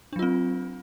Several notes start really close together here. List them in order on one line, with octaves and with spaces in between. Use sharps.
D4 F#3 F4 C4